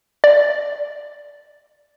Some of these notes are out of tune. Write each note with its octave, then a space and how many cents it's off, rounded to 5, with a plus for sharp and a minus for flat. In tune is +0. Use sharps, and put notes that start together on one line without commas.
D5 +0